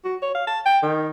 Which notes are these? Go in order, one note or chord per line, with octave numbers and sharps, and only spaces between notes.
F#4
C#5
F5
A5
G5
D#3